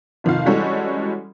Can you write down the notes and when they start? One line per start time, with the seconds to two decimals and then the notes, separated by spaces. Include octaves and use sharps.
0.24 F1 D#3 F3 F5
0.46 E3 G3 G#3 C#4 F#4 A4